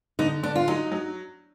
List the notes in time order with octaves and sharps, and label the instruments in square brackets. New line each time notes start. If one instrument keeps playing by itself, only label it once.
[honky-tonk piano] D3 [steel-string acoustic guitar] D#4
[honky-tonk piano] D3 [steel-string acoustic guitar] D4
[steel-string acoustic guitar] F4
[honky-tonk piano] F#3 [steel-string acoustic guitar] D#4
[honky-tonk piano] F#3